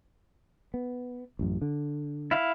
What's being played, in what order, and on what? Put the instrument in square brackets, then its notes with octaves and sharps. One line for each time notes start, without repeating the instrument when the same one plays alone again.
[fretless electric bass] B3
A1 F#2
D3
[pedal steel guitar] E4 F5